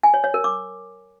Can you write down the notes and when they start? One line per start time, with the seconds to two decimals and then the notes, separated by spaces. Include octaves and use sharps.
0.03 G#5
0.14 C#5
0.24 C#5
0.34 A#4
0.44 D6